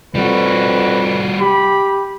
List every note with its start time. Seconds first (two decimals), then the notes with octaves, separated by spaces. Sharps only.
0.15 F2 G3 F#4 B4
1.40 G4 B5